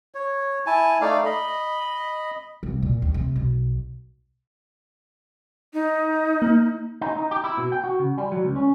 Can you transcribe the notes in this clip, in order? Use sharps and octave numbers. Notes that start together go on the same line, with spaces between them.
C#5
E4 G#5 A5
A3 D#4 D5 F5
D#5 B5
C2
A#2
D#2
C3
B1
D#4
A#3
D#4
D#4
G4
E4
B2
G5
F#4
C#3
G3
F#3
C#2
C#4